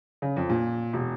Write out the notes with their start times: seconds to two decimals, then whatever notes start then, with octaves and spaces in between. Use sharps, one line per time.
0.22 C#3
0.36 F2
0.50 A#2
0.93 E1